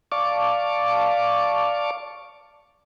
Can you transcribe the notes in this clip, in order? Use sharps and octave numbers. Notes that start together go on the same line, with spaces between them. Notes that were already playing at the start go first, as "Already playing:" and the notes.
D5 F5 A5 C#6 D6